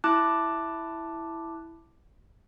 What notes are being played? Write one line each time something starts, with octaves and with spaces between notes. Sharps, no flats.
E4 A5 D6 F#6